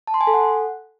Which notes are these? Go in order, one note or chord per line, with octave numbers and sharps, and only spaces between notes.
A5
C6
G#5
A4
F#5